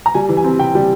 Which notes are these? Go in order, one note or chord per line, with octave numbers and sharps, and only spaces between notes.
A#5
G3 G#5
E3
G#5
C4
C3 G5
G3